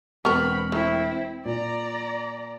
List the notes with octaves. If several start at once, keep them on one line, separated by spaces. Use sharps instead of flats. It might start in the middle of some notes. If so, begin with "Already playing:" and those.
E1 B3 C4 A#4 B5 C#6 F6
A3 C4 E4
A#2 D5 A#5